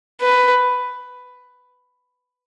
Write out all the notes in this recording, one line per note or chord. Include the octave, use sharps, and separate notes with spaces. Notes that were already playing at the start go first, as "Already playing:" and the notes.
B4